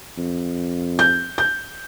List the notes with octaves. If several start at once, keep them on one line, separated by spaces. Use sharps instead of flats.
F2
G6
G6